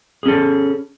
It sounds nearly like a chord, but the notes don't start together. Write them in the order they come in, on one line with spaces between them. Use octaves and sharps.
G#4 C#4 A4